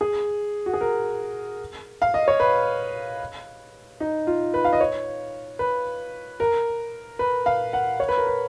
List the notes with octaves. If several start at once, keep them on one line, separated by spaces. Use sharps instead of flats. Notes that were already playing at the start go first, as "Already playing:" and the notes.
G#4
F#4
G#4
A#4
F5
D#5
C#5
B4
D#4
F4
B4
F5
D#5
C#5
B4
A#4
B4
F5
F#5
C#5
B4
A#4
B4